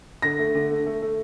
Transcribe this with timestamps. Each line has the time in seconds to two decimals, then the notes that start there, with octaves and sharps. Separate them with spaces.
0.22 D3 A#6
0.39 A3
0.55 D3
0.70 A3
0.86 A3
1.02 A3